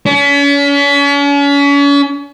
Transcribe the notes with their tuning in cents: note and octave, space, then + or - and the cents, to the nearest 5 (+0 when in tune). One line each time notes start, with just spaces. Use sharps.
C#4 +40